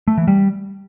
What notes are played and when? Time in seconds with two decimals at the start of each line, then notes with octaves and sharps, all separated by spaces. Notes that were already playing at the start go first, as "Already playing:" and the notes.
0.08 A3
0.18 E3
0.28 G3